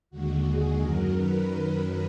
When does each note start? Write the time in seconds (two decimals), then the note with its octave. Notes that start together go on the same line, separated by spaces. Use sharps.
0.10 D#2 D3 G#3 F#4
0.45 G#4
0.80 F#2 D#3 F#3 A#4
1.15 B4